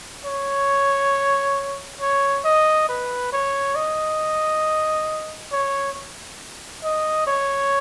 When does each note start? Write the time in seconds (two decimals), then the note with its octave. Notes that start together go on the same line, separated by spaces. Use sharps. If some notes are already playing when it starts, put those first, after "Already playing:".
0.24 C#5
2.00 C#5
2.44 D#5
2.89 B4
3.32 C#5
3.75 D#5
5.52 C#5
6.83 D#5
7.27 C#5